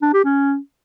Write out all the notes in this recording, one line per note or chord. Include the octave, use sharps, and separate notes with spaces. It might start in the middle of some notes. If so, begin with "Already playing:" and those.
D4
G4
C#4